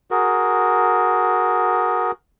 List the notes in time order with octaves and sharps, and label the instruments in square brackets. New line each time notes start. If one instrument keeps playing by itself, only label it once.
[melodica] F#4 G#4 A#4